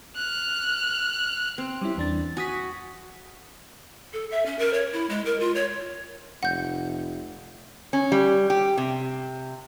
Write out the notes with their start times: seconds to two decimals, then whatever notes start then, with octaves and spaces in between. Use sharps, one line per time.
0.16 F6 F#6
1.58 C4
1.82 G3 C#4 E4
1.97 E2 D4 A6
2.37 F#4 G#5 D#6 B6
4.13 A4
4.31 E5
4.46 C#4
4.59 A#4
4.74 C#5
4.93 E4
5.10 G#3
5.26 A#4
5.40 F4
5.55 C#5
6.43 F1 F#5 G6
7.93 C#4
8.12 G3
8.50 G4
8.77 C3